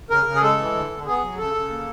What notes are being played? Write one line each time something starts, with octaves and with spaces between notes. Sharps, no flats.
C#3 A#4
C#3
G#4
G#3 A4
E3
D3
D3
B3 G#4
F#3
C#3 A4
C#3
A#3